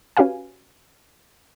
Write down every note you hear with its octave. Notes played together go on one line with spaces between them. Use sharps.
C#4 F#4 G4 B4 F5 G#5